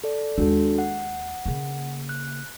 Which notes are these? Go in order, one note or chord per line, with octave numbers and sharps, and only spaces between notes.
A4 D5
D#2 G#3 D4 F#4 A4
F#5
C#3 A#3
F#6